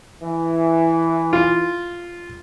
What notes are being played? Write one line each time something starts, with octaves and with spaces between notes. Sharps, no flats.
E3
F4